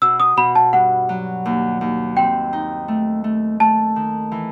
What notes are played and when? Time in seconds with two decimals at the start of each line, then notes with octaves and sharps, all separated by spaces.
0.02 B2 E6
0.20 D#6
0.37 B2 B5
0.55 A5
0.73 G2 F#5
1.09 F#3
1.45 D#2
1.81 D#2
2.16 C4 G5
2.53 D#4
2.88 A3
3.24 A3
3.60 A3 A5
3.96 D#3
4.32 E3